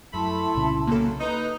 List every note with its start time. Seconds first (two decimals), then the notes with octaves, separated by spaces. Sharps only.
0.14 F#2 A3 E4 A4 A5 B5 C6
0.55 C2 A#2 C#3
0.87 F#2 A#3 A4
1.20 D#4 B4 D#5